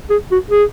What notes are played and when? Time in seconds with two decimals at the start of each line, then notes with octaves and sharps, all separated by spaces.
0.10 G#4
0.32 F#4
0.51 G#4